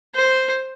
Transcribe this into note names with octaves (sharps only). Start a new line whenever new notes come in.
C5